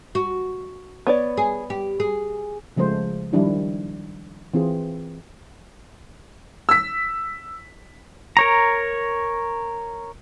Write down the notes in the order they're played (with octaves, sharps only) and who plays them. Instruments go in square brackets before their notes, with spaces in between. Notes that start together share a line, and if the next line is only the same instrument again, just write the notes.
[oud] F#4
[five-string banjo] B3 C#5 D5
[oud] G#4
G4
G#4
[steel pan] C#3 F3 G#3 A3 C5
D#3 F3 G3 D4 E4
E3 C4 F4 G#4 C5
[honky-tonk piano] E6 B6
[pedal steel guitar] A#4 C#5 A#5